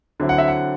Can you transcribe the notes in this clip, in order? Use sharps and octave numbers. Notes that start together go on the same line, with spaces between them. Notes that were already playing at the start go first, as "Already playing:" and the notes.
D3 F#3 C4 E4
F#5
E5
F#5